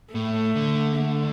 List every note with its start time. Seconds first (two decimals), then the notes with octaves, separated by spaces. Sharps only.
0.14 A2 A3
0.56 D3
0.96 A3